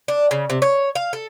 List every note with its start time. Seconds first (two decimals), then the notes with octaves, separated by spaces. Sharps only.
0.08 D4
0.31 C#3
0.50 C3
0.62 C#5
0.95 F5
1.13 A4